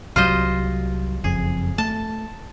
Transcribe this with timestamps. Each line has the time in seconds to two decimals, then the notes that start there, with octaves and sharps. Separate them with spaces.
0.16 C2 F#3 G3 F4 C5 D#5
1.24 F#1 F2 G#4
1.78 A3 A5